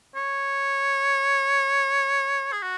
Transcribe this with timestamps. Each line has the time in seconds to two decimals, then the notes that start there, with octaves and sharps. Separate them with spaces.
0.16 C#5
2.52 G#4
2.63 F#4